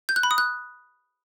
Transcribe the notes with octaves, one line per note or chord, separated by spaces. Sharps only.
G6
F#6
B5
D#6
F#6